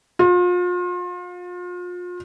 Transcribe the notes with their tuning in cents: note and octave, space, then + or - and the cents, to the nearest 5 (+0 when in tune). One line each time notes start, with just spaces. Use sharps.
F4 +35